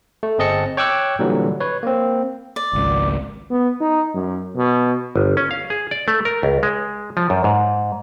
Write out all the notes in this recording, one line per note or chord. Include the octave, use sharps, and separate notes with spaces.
A3
G1 C4 G#4 D#5 A5 C#7
C#5 G5 C#6 D6 E6 F#6
A#2 D3 E3 F#3 G3
B4 C#5
A#3 C4
D5
G#1 C#2
B3
D#4
F#2
B2
G1
C#4
F5
G#4
D5
A3
A#4
C#2
G#3
F3
F#2
G#2